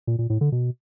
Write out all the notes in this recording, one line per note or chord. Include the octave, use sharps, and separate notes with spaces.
A#2
A#2
A2
D3
B2